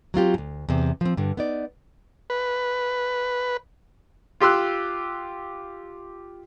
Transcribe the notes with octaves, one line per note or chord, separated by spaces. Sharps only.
F#3 C4 F4 G4
D2 G#2
E2 C3
F3 C4
G2 D3
B3 D#4 D5
B4
F4 G4 C6 E6 F#6